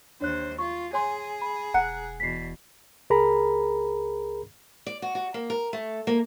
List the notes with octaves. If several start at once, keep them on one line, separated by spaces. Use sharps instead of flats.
D#2 D4 C5 C#5 F#6
F4 C#6
G#4 C#5 G#5 C6
B5
E1 F#5 A#5 F#6
E2 B2 B6 C7
C#2 G#4 A#4 A#5 B5
D5
F#4
F#4
A#3
A#4
A3
A#3